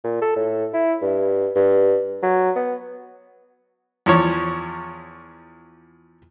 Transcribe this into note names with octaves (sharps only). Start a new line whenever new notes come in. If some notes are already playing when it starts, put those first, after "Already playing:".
A#2
A4
A2
E4
G2
G2
F#3
B3
E2 F3 C#5